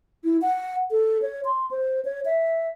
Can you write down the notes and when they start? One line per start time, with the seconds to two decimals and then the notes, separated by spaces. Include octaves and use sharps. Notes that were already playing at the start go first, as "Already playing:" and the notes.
0.24 E4
0.42 F#5
0.91 A4
1.22 C#5
1.45 C6
1.71 C5
2.05 C#5
2.25 E5